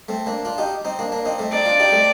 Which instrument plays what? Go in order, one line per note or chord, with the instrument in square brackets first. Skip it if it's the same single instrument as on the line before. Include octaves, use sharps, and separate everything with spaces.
[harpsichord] A3 C4
A#3 D4
D4 F4
D#4 G4
C4 D#4
A#3 D4
A#3 D4
C4 D#4
A3 C4
[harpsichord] C4 D#4 [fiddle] D5
[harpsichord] D4 F4
D#4 G4
A3 C4